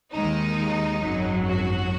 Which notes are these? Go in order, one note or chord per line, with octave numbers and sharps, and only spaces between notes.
D#2 D#3 G#3 D#4
G#1 F#2 F#3
F#4